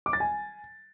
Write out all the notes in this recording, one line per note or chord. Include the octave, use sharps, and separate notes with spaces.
D6
A6
G#5